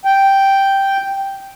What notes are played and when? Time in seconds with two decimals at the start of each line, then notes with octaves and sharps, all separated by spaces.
0.05 G5